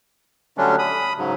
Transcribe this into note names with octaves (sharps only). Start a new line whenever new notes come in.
D3 F#3 G3 A3 C#4 D4
B5 D#6
G#2 C#3 F#3